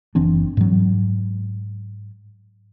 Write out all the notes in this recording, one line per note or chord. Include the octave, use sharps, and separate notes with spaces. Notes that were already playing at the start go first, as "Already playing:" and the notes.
F#1 E3 C4 D4
G#2 F#3